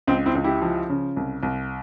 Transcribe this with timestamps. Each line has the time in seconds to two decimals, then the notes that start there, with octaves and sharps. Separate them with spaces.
0.07 C#2 C4
0.26 C4 E4
0.35 C#2
0.44 E4 G4
0.62 F3
0.89 C#3
1.17 C2
1.43 C2